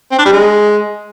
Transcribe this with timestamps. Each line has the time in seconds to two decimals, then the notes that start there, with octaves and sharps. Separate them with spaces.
0.11 C4
0.18 D4
0.25 G3
0.32 G#3